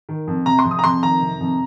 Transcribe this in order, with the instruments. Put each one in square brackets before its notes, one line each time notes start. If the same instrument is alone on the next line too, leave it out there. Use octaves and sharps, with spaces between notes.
[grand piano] D#3
F2
C3 A#5
C6
F2
D#6
A#5
F2 C6
D#3 A#5
C3
F2